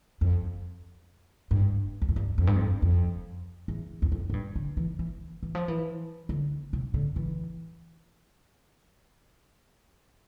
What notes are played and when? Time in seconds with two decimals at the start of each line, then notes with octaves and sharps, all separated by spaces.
0.21 F2
1.51 G2
2.02 E2
2.09 F2
2.16 G2
2.38 F2
2.47 G2
2.56 F2
2.82 F2
3.68 E2
4.02 E2
4.12 F2
4.30 A2
4.34 G2
4.55 D3
4.77 E3
4.99 E3
5.43 E3
5.55 F3
5.68 E3
6.29 D3
6.73 C3
6.94 D3
7.16 E3